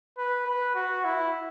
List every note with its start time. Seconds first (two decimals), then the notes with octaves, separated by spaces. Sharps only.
0.17 B4
0.46 B4
0.75 F#4
1.04 E4